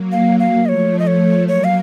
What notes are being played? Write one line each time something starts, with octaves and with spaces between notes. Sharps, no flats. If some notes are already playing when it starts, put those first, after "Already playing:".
Already playing: F#3 A#3
F5
F5
F3 A3 C#5 D#5
D#5
F3 A3 C#5
F#3 A#3 C#5
F5